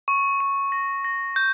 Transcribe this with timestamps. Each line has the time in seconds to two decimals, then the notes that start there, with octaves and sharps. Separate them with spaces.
0.08 C#6
0.40 C#6
0.72 A#6
1.04 A#6
1.36 G6